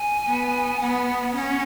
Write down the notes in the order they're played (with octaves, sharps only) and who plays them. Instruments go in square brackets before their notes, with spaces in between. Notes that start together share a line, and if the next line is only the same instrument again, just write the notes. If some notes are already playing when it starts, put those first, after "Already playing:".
Already playing: [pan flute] G#5
[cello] B3
[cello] B3 [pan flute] F#5
[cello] C#4 [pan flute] F#5